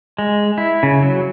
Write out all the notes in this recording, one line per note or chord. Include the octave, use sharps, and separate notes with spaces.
G#3
E4
C#3
F#3